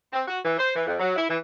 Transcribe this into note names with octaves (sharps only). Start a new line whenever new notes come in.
C4
F#4
E3
C5
E3
F2
F#3
E4
E3